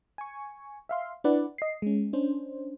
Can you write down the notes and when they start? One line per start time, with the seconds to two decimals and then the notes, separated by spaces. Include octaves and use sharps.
0.18 G#5 C#6
0.89 E5 F5 C6
1.24 D4 E4 B4 D5 F#5
1.58 D#5 C7
1.82 G#3 C#4
2.13 C#4 D4 C5